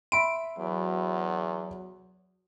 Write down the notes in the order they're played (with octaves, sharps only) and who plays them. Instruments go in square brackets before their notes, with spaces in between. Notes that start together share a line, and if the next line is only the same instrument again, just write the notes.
[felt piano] E5 B5 C6 [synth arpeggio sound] D7
[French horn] E2 [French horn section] F#3